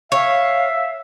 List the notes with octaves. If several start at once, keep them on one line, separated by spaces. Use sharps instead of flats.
C#5 E5 F5